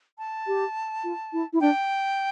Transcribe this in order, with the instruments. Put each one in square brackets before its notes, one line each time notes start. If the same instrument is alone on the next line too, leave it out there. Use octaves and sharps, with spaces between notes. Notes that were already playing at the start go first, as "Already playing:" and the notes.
[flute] A5
[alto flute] G4
F4
E4
E4
[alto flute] D4 [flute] G5